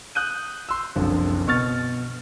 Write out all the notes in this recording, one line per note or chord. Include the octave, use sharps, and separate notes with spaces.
D#6 F#6 G6 D#7
C6 E6
F#1 C2 D3 F3
B2 C#6 F6 A6